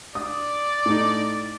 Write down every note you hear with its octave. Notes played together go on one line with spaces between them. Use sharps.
D5 D#6
A2 D#4